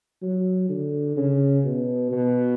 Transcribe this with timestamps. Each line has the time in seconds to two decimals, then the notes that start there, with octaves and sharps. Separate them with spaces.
0.22 F#3
0.70 D3
1.16 C#3
1.64 B2
2.11 B2